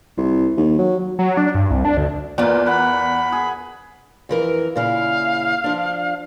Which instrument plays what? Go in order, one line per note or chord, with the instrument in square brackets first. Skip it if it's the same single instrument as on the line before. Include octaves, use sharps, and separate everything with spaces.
[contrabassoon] C2
D#2
F#3
[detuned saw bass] F#3
D4
G2
C2
D4
D2
[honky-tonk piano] E2 [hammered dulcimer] F4 A#4 [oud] B4 D5
[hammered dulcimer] F#5 [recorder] B5
[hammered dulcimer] G#4
[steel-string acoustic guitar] F2 E3 A#4
[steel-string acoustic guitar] A#2 C#3 E4 [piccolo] F5
[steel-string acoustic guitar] F3 D4